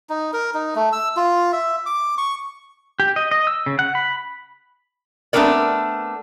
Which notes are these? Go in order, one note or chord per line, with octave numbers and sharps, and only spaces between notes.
D#4
A#4
D#4
A3
E6
F4
E5
D6
C#6
G4
D#5
D#5
E6
C#3
F#5
B5
A3 B3 C4 D4 A#4 D5